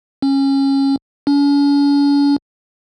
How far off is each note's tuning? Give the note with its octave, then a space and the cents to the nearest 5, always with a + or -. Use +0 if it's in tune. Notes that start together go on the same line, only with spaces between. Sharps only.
C#4 -20
C#4 +45